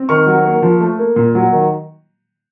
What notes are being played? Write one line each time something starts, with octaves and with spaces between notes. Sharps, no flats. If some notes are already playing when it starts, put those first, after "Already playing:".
Already playing: C4
D#3 C#6 F6
F#3
A#3
F3
A3
A#3
A#2
F#3
D#3